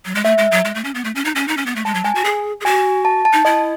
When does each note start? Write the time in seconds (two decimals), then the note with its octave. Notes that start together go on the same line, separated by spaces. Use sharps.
0.05 F#3
0.15 G#3
0.24 A3 E5
0.38 G#3
0.52 F#3
0.65 G#3
0.75 A3
0.84 C#4
0.95 B3
1.05 A3
1.15 C#4
1.25 D#4
1.35 C#4
1.48 D#4
1.57 C#4
1.66 B3
1.76 A3
1.85 G#3 A5
1.95 F#3
2.04 G#3 G#5
2.15 F#4
2.25 G#4
2.61 G#4
2.65 F#4 G#5
3.05 A5
3.25 A5
3.33 D#4
3.45 E4 D#5